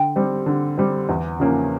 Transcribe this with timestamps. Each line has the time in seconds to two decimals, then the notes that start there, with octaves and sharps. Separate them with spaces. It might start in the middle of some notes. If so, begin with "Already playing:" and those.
Already playing: D3 G5
0.16 G3 C4
0.46 D3
0.78 G3 C4
1.09 E2
1.40 C#3 F3 A#3 C#4